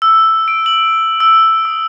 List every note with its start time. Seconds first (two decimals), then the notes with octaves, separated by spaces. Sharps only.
0.02 E6
0.48 D7
0.66 F#7
1.20 E6
1.65 D#6